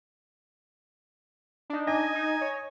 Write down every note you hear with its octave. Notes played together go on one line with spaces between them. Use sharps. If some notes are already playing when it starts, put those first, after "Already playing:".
D4 D#4
D#5 G#5
D#4
C#5